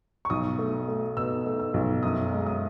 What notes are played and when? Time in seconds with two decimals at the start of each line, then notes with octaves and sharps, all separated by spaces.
0.25 C#6
0.30 B1 D#6
0.59 A3
0.88 A3
1.17 B2 E6
1.46 A3
1.59 E6
1.74 B1
2.03 F#2 D#6
2.32 G#3
2.46 D#6